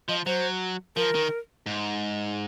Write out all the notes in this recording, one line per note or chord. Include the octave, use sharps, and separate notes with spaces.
F3 D#5
F#3 C5
F3 A#4
D#3
G#2